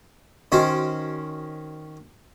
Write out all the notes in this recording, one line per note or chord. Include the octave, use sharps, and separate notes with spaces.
D#3 C#4 F#4 C5 D#5